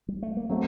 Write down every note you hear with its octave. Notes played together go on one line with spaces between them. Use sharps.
G3
A3
A#3
F#3 A3 C4